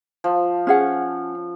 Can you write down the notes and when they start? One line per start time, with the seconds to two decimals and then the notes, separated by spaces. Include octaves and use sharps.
0.24 F3
0.67 C#4 G#4 F#5